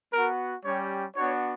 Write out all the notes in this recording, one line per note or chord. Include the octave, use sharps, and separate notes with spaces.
B3 F#4 A#4
G3 C#4 G4 C#5
B3 D4 F#4 C#5